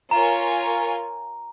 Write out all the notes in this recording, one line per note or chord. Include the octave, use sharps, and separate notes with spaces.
F4 A#4 C#5 G#5 A#5